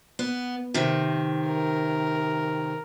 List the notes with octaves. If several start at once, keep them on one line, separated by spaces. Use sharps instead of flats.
B3
C3 D#3
A#4